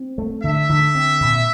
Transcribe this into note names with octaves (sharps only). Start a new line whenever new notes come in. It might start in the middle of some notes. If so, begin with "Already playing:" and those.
Already playing: C4
A3
D3 E5
D3
C4
A#2